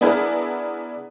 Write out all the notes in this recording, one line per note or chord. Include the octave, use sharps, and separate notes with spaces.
B3 D4 E4 G#4 A#4 B4